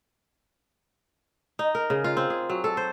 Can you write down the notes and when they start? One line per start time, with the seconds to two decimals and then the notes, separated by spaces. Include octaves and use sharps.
1.59 D#4
1.75 A#4
1.90 C#3
2.04 F4
2.17 C4
2.30 G#4
2.50 F#3
2.64 A4
2.77 C5